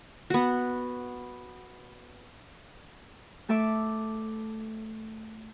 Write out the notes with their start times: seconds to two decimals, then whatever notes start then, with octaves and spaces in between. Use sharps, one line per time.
0.30 B3 F#4
3.49 A3 A4 E5 D6